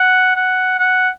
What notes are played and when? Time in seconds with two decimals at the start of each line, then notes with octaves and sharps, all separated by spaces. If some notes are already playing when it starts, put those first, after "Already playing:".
Already playing: F#5
0.35 F#5
0.79 F#5